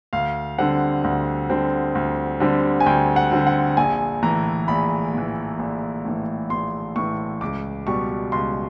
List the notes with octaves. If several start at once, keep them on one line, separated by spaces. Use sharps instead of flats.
D2 F5
D3 G3 C4 F#5
D2
D3 G3 C4
D2
D3 G3 C4
G#5
D2 G5
F#5
D3 G3 C4
F#5
A#1 G#5
A2 E3 A#5
A#1 B5
A2 E3
A#1
A2 E3
A#1 C6
A2 E3 C#6
C#2 D6
B2 G3 C#6
C#2 C6